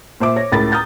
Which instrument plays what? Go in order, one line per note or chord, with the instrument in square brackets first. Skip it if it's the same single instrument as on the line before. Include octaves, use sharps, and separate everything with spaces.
[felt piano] A#2 C5 E5 D6
C#5 A#6
C#2 A2 A#4 B5 A6
A#5 D#6 F6 G6 A6